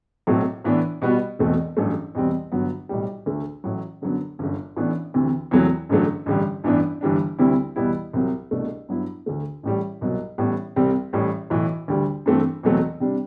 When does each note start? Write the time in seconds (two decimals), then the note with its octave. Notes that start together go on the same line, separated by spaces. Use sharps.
0.27 B1 A2 F#3 A3 C4
0.64 A2 E3 B3 D4
1.02 B2 G3 B3 F#4
1.39 E1 E2 B2 A3 C4
1.77 A1 G2 F#3 A3
2.15 E2 B2 G3 C4
2.52 G1 G2 F#3 B3 F#4
2.89 B1 A2 G3
3.26 D2 D3 A3
3.64 A1 A2 F#3
4.02 F#2 D3 F#3 B3
4.39 G1 F#2 D3
4.76 A1 A2 E3 B3 D4
5.14 D2 C3 E3
5.51 E2 C3 F#3 A3 E4
5.89 A1 G2 D3 F#3 A3
6.26 A1 G2 D3 G3
6.64 A1 G2 E3 B3 D4
7.01 G1 G2 E3 G3 D4
7.39 D2 C3 G3 C4 E4
7.76 E2 B2 G3 B3 E4
8.13 C2 C3 F#3
8.51 C2 B2 A3 D4
8.89 G2 F#3 B3 E4
9.26 D2 D3 A3
9.63 A1 A2 G3
10.01 C2 B2 F#3
10.38 A1 A2 G3 B3
10.76 C2 C3 G3 C4
11.13 A1 A2 G3
11.50 B1 A2 E3
11.88 D2 D3 G3
12.26 G2 E3 A3 C4
12.63 E2 B2 F#3 A3 C4
13.00 C3 G3 D4